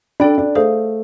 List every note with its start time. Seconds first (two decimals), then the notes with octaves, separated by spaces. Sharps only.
0.20 D4 A4 D5 G5 B5
0.38 D4
0.55 A3 G#4 C5 F5